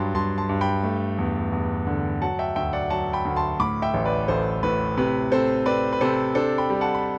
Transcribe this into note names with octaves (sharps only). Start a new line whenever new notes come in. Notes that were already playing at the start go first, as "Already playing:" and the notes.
Already playing: G2 F#3 G5 A5 B5 C6
G2 A5 C6
A5 C6
G2
G5 B5
A3
E2
E2
D3
F#3 F#5 A5
E5 G5
D2 E5 G5
D5 F#5
F#3 F#5 A5
G5 B5
D2
A5 C6
A2 B5 D6
E5 G5
A1
B4 D5
A1 A4 C5
A2 B4
C3 B4
C4 A4 C5
C4 B4 D5
B4
C3 A4 C5
D4 A4 C5
G5 B5
G3
F#5 A5
B5